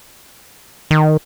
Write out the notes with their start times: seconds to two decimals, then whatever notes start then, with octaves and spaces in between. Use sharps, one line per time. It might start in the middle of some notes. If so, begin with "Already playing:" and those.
0.91 D#3